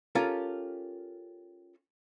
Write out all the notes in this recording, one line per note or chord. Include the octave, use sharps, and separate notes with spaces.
C#4 F4 G4 A4 A#4